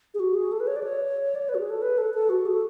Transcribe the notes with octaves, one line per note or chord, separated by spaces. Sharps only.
G#4
F#4
G#4
A4
B4
C#5
D5
C#5
D5
C#5
B4
F#4
G#4
A4
B4
A4
A4
F#4
G#4
A4